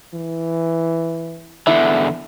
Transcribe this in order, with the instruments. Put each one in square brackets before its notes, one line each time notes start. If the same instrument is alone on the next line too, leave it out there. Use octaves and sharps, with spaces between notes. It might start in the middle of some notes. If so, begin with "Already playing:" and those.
[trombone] E3
[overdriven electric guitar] E2 D3 [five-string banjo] E4